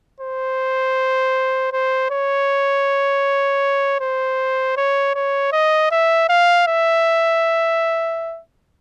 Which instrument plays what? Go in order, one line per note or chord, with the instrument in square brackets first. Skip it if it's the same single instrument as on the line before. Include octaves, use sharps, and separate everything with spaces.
[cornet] C5
C5
C#5
C5
C#5
C#5
D#5
E5
F5
E5